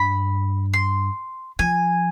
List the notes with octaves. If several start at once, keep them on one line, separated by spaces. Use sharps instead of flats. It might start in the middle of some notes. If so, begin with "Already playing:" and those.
Already playing: G2 B5
C6
F3 G#5